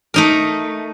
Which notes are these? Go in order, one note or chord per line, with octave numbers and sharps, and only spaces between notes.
A3 D#4 A#4